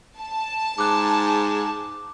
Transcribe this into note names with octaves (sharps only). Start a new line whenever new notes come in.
A5
G#2 D6 F#6